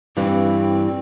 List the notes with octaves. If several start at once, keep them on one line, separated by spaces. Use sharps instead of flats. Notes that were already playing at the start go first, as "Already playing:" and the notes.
G2 E3 G3 C4